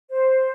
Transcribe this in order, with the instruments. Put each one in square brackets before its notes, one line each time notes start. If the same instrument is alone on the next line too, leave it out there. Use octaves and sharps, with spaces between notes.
[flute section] C5